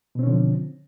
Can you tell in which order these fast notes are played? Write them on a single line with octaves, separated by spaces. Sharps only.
B2 C4 C#4 D3 F3